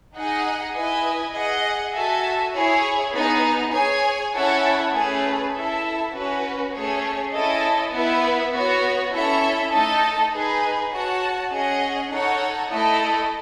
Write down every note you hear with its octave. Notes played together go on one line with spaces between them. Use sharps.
D#4 G#4 D#5 F#5
E4 B4 D#5 G#5
G#4 D#5 F#5
F#4 A4 E5 G#5
E4 G#4 C#5
B3 D#4 G#4
G#4 C#5 G#5
C#4 E4 A4 C#5 F#5
A3 C#4 G#4 B4
E4 A4 E5
C#4 F#4 B4
A3 C#4 G#4 C#5
C#4 E4 A4 D#5 A5
B3 E4 B4 E5
B3 F#4 C#5
C#4 E4 A4 C#5 E5
A3 D#4 A4 D#5 A5
D#4 G#4 B4
F#4 C#5 F#5 A5
C#4 G#4 D#5 F#5
D#4 A4 C#5 F#5
A3 E4 A4 D#5